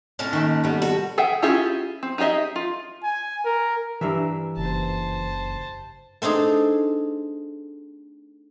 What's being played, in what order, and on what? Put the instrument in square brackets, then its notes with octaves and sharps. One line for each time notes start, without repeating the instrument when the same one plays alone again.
[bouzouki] A2 C#4 A5
[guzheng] D#3 E5 B5 [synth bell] A#3 D#4
[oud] G3 B3
[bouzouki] F#4 A4
[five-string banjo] G#4 E5 F#5 G5
C#4 E4 F4 G4 G#4
C4
D#4 G4 G#4 D#5 E5
F4
[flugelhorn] G#5
A#4
[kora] G2 A#4 E5 [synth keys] E3
[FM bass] F#1 [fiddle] C5 A5
[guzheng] A3 C4 D4 D#4 G#4